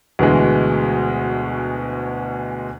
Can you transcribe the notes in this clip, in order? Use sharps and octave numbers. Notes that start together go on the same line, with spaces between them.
D2 B2 E3 G#3